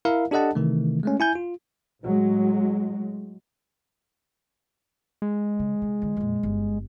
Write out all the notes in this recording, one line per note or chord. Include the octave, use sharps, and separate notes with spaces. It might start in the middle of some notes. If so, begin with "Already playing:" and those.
E4 A#4 E5 F5
D4 G4 A4 D#5 F#5 A5
C3 D#3 E3 A3
G#3 A3 C#4
E4 G#5 G6
F4
A2 F#3 G#3
G#3
C#3
C3
E2 D3
F2 A#2
G1